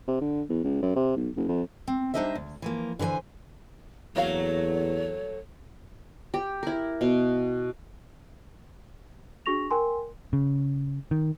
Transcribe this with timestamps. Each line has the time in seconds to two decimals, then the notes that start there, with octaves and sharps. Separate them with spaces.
0.08 C3
0.21 D3
0.49 E2
0.64 C#2
0.83 F#2
0.96 C3
1.17 B1
1.36 F#1
1.49 F2
1.87 C4
2.14 G3 D4 D#4 C5 D#5 E5
2.35 D2
2.62 E3 F3 A#3
2.99 D3 E3 B4 C5 G#5
4.16 E2 F#3 A3 A#3 F#4 C#5 F5
6.34 G4
6.63 E4 A#4
7.01 B2
9.46 D4 F#4 G#4 C#6 A#6 F7
9.71 A#4 G5 G#5 C6
10.33 C#3
11.11 D#3